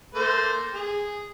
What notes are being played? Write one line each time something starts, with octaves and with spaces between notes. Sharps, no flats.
A3 A#3 C5
G#4